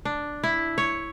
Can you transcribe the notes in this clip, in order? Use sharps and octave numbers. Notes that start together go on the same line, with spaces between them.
D4
E4
C#5